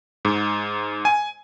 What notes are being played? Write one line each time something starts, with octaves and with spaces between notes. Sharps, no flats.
G#2
G#5